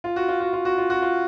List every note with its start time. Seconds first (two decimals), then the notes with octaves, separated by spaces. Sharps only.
0.04 F4
0.16 F#4
0.28 F4
0.40 F#4
0.53 F4
0.65 F#4
0.78 F4
0.90 F#4
1.02 F4